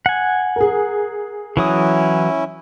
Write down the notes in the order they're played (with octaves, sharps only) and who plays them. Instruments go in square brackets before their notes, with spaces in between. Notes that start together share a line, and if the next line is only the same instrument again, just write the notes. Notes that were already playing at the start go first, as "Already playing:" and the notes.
[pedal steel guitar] F#5 G#5
[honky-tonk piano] G#4 A#4
[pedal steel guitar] E3 F#3 D#6 [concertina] C#4 E4